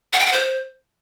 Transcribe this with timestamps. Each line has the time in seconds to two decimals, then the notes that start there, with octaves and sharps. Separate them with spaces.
0.13 F#5
0.20 G5
0.26 F#5
0.33 C5